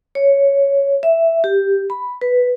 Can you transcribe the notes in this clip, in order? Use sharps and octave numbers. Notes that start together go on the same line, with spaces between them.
C#5
E5
G4
B5
B4